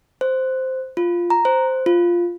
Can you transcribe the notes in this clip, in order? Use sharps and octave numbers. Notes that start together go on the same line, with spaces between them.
C5
F4
A#5
C5
F4